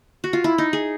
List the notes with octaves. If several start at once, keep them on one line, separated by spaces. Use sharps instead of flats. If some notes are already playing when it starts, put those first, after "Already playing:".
F#4
F4
E4
D#4
G#4